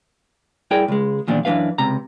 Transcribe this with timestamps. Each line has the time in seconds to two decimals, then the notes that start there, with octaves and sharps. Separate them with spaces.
0.71 G2 E4 G#4 A#4 D5 G5
0.88 C#2 G#3
1.28 E2 A#2 D#3 F3 D4
1.45 F#2 E3 A3 D4 B4 F5
1.78 C#2 C3 A#5